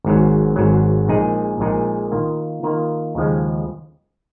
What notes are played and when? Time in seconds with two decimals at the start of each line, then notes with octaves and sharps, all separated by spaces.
0.04 G#1 G#2 F#3
0.56 G#1 G#2 F#3
1.08 A#1 A#2 G#3 D#4 G#4
1.60 A#1 A#2 G#3 D#4 G#4
2.12 D#3 A#3 F4
2.63 D#3 A#3 F4
3.15 D#2 C#3 F3 G#3